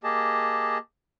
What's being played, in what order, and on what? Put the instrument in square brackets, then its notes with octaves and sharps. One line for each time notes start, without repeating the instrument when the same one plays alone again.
[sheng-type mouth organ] A#3 G4 G#4 D#5 A5